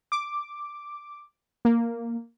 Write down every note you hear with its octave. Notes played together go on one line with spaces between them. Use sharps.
D6
A#3